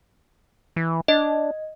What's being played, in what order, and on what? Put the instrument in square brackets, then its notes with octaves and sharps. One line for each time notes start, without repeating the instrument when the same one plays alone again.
[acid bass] E3
[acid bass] D4 [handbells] D#5